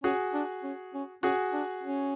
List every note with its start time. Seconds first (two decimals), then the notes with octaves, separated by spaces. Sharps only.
0.03 C#4 F#4 G#4
0.33 D4
0.63 C#4
0.94 C#4
1.23 C#4 F#4 G#4
1.53 D4
1.83 C#4